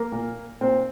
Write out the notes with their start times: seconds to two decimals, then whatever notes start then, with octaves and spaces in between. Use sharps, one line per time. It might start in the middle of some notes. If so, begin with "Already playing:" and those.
Already playing: A#3 A#4
0.12 A#2
0.61 A#2 C4 C5